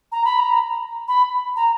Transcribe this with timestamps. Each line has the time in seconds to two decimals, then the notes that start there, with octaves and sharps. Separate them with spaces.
0.12 A#5
0.25 B5
0.39 A#5
1.08 B5
1.56 A#5